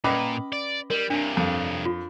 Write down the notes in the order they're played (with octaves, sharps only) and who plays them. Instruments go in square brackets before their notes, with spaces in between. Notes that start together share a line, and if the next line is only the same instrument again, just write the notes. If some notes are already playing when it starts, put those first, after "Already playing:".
[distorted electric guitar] A#2 [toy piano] C#4 B4 [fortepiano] D#5 B5 D6
[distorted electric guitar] D5
[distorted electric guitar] G3 [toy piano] A#4
[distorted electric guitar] G2 C3 [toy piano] D4 G#5
[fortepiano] F2 [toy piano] A5
[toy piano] F4